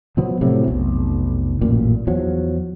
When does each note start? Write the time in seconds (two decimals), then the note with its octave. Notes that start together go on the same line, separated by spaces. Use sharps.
0.17 B2 F3 F#3 B3
0.41 A2 C3 E3 F#3
0.68 F1 B1
1.61 A1 F#2 A#2
2.07 E2 F3 F#3